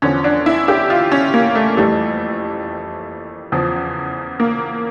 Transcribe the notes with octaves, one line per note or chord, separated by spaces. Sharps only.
E2 D3 F3 C#4
D4
E4
G4
F4
C#4
A#3
A3
F2 E3 G3 A3
E2 C#3 F3
A#3